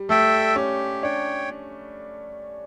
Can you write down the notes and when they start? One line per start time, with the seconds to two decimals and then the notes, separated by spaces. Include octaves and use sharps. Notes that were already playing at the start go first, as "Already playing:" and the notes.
Already playing: G3
0.09 A3 A4 E5 G5
0.56 C#4 G4
1.03 D4 C#5 G5